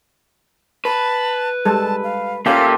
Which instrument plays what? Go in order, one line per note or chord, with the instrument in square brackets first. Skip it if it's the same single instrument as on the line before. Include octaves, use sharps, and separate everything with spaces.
[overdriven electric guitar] B4 [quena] A5
[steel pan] G3 G#3 A4 [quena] A5
[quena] F5
[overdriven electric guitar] A#2 [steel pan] A#3 C#4 A#4 [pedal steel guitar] G4 A4 E5 [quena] F5